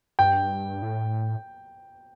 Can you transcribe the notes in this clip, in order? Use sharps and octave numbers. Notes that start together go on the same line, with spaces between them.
G2 G5
A2